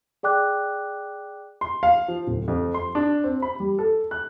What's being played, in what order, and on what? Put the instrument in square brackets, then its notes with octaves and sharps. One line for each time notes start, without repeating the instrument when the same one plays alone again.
[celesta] G#4 D5 G5 D6 F#6
[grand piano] C6
F5
F3
D1
F2
C6
D4
C4
B5
G3
A4
F#6